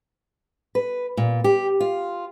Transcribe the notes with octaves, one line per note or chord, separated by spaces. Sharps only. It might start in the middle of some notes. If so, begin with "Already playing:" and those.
B4
A#2
G4
F4